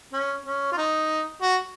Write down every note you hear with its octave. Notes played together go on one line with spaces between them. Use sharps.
C#4
C#4
F4
D#4
F#4